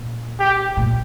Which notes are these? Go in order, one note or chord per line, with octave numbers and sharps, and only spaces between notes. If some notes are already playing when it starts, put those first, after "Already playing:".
Already playing: A#2
G4
A#2